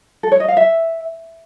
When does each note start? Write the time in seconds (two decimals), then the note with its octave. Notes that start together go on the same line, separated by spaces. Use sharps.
0.23 A4
0.32 C#5
0.40 D#5
0.48 F5
0.57 E5